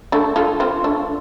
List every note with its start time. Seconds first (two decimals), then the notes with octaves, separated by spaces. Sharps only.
0.12 A3 D4
0.36 F4 A4
0.60 C4 F4
0.84 A3 D4